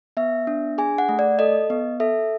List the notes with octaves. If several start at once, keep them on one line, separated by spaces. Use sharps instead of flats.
B3 E5
D4
G#4 G#5
F#5
A3
D5
A4 D#5
B3
A4 E5